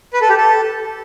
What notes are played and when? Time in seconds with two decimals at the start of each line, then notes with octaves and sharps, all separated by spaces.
0.13 B4
0.21 A4
0.29 G4
0.37 A4